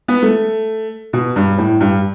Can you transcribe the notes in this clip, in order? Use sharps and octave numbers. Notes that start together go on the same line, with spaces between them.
B3
A3
B2
G2
A2
G2